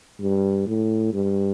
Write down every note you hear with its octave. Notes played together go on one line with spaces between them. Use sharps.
G2
A2
G2